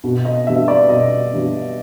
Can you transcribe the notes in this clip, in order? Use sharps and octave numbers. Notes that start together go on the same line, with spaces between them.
B2
D#5
G3 B3 D4 E5
D5
B2 D#5
G3 B3 D4